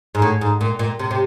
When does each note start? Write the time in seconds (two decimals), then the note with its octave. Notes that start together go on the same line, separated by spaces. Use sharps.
0.15 G#2
0.22 A2
0.41 G#2
0.61 A#2
0.79 A#2
0.99 C3
1.11 C3